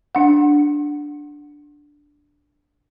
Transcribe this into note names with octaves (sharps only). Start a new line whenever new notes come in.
D4 F#5